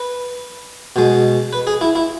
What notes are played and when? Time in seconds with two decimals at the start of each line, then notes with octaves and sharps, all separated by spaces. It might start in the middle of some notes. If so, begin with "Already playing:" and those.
Already playing: B4
0.96 B2 G#3
1.53 B4
1.67 G#4
1.81 E4
1.95 E4